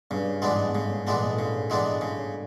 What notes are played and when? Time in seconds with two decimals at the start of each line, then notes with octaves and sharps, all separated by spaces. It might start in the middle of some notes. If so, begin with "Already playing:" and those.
0.11 G2 C#3
0.42 G#2 E3 G#3 B3 D4
0.68 G#2
0.75 A2 C#3
0.90 A2
1.06 A#2 E3 G#3 B3 D4
1.23 A2
1.39 C#3
1.70 E3 G#3 B3 D4
2.01 C#3